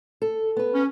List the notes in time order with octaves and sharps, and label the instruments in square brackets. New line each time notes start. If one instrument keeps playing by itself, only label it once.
[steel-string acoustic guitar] A4
B3 B4
[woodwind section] C#4